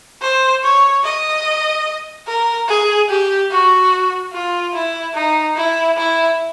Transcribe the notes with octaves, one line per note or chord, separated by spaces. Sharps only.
C5
C#5
D#5
A#4
G#4
G4
F#4
F4
E4
D#4
E4
E4